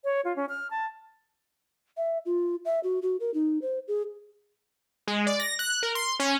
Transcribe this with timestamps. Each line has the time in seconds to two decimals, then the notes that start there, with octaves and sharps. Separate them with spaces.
0.04 C#5
0.25 F4
0.36 C#4
0.49 F6
0.71 A5
1.97 E5
2.26 F4
2.65 E5
2.83 F#4
3.02 F#4
3.20 A#4
3.34 D#4
3.62 C5
3.88 G#4
5.07 G#3
5.27 D5
5.40 A#6
5.59 F#6
5.83 A#4
5.95 C6
6.20 C#4